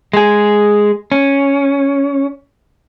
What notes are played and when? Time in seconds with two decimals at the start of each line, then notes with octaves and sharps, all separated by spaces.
0.13 G#3 G#4
1.12 C#4